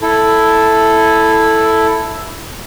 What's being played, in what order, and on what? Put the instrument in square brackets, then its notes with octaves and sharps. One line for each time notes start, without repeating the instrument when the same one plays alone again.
[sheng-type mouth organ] E4 A4